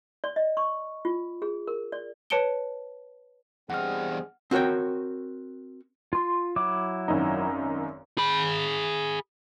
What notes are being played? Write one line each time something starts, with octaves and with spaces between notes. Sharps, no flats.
D5
D#5
C#6
F4
G#4
A#4
D5
B4 C#5 A5 C#7 D7 G7
E2 G2 C4 G#4 D#5 F#5 F6
C4 F#4 A#4 C#5 G5
F4 C6
F#3 E4 D6
G#1 F#2 D#4
G#4 B5